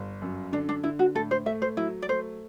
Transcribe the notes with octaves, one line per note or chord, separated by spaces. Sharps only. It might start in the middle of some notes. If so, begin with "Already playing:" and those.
Already playing: G1
F#2
D3 D4
D4
D3 E4
F#4
A2 A4
C5
A3 E5
C5
F#3 E4
D5
A3 C5